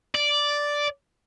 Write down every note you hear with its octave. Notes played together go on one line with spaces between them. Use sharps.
D5